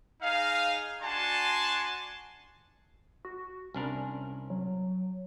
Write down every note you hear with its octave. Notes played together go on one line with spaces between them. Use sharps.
D#4 G#4 F5
D4 F#4 G#5 A5 C6
F#4
C2 C#4 D4 A#4
F#3